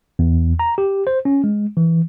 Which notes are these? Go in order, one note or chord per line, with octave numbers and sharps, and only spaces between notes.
E2
A#5
G4
C5
C#4
G#3
E3